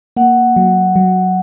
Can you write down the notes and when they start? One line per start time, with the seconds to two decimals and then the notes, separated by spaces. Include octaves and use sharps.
0.17 A#3 F#5
0.56 F#3
0.96 F#3